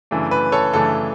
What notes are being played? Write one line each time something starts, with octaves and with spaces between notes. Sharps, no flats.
F#2 C#3 E3 A3 D4
B4
A4 C#5
F#2 C#3 E3 A3 D4 A4